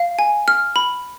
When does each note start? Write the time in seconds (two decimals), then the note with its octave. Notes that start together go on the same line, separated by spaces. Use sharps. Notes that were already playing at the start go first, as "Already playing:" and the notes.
Already playing: F5
0.19 G#5
0.48 F6
0.76 B5